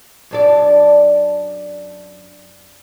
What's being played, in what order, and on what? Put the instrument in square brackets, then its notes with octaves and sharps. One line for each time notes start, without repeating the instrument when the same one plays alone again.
[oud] F#2 D4 D5